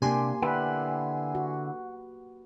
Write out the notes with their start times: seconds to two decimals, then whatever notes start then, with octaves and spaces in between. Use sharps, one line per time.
0.02 C3 A#3 D4 G4 G#5 C6
0.42 D3 E4 B4 F#5 G5
1.35 F#4